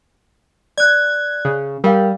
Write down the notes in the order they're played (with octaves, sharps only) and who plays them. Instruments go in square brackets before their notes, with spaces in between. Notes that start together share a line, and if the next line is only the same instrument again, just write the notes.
[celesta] D5 F#6 [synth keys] G#6
[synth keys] C#3
[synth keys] G3 [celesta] A#4 F5 G5